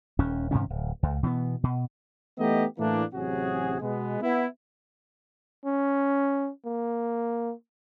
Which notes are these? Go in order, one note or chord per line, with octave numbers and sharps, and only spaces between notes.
D#1 D#2 C#4
G2 C3 D#3 C#4
D1
C#2
B2 E3 A3 B3
B2
E3 A3 B3 D#4 G4 D#5
A2 E3 A3 A#3 D4
A1 C3 F#3 F#4 G#4
B2 G#3 B3
B3 E4
C#4
A#3